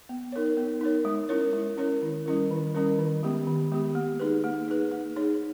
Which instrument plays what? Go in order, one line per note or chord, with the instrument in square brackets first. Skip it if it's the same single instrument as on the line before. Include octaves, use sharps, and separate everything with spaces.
[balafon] B3
D#4 A#4 C#5
B3
D#4 A#4 C#5
G#3
C#4 E4 A#4 C#5
G#3
C#4 E4 A#4 C#5
D#3
G3 C#4 E4 A#4
D#3
G3 C#4 E4 A#4
D#3
G#3 B3 G4
D#3
G#3 B3 G4
A#3
D#4 G#4 B4
A#3
D#4 G#4 B4
A#3
D#4 G#4 C#5